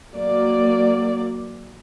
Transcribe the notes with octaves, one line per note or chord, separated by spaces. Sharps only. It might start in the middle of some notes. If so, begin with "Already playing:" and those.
F#3 A#3 D5